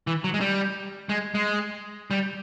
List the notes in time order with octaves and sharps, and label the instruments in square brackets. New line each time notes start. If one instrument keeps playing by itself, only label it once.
[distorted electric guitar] E3
F#3
G#3
G3
G#3
G#3
G3